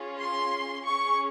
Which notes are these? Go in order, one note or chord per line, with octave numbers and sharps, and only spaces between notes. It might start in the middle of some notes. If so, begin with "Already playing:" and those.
Already playing: C#4 F4 G#4
C6
C#4 G#4 C#6